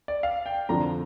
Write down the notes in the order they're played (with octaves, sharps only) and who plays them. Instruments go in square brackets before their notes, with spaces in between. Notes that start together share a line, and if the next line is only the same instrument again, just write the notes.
[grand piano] D5
F5
G5
[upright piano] F2 D3 F3 D4 [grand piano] A#5